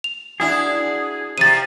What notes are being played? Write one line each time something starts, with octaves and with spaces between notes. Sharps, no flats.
F7
D4 E4 F#4 G#4
C3 F3 G4 A6 D#7